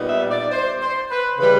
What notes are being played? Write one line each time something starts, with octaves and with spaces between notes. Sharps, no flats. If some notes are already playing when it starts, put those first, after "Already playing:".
Already playing: A#2 G3 B3 D#4
E5
D5
C5
C5
B4
C#3 E3 G3 B4